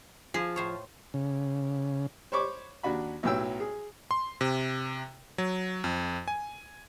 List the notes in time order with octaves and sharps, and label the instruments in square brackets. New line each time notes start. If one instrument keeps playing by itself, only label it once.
[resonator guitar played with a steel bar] F3 [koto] G#4
[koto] A2 C5 C#5
[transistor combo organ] C#3
[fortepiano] C5 C#5 B5 C#6 D6
D#2 D4 F#4 B5
B1 A2 F#3 G5 E6
G#4
[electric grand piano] C6
C3
F#3
F2
G#5